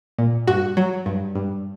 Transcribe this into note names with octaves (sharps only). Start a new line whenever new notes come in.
A#2
G2 F#4
F#3
G2
G2